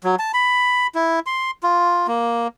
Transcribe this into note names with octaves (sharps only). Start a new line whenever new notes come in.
F#3
A5
B5
E4
C6
F4
A#3